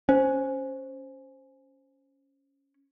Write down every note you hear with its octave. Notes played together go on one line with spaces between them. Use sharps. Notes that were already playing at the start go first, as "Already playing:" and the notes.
C#4 C5